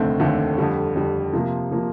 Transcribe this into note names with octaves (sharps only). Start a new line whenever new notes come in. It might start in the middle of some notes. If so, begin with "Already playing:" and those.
Already playing: F1 D#2 D3 A3 C4
F1 D#2 D3 A3 C4
F2 D3 G3
F2 D3 G3
C3 F3 A#3
C3 F3 A#3